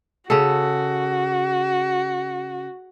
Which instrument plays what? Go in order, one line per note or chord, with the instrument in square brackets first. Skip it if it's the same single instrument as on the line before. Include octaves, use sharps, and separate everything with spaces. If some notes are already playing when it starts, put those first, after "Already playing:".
[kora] C#3 A4 [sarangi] F#4